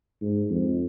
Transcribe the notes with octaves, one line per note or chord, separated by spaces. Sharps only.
G#2
F2